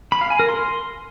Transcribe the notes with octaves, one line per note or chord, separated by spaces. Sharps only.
B5
F5
G#5
A#4
C6